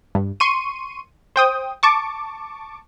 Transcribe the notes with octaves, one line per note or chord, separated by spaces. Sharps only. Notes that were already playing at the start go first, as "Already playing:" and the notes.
G2
C6 C#6 D#7
C5 G5 D#6
A5 C#6 D6